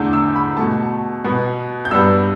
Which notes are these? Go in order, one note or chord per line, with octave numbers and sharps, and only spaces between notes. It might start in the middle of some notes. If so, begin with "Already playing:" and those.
Already playing: E2 D3 A3 G6
E6
B5
B2 A3 A5
B2 B3
G6
G2 G3 B3 E6